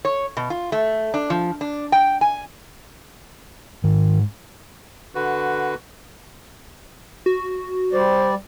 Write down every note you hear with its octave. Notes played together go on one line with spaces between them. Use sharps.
C#5
B2
F4
A3
D4
F3
D4
G5
G#5
G#2 D#3
D3 F#4 B4
F#4
G3 C5 D5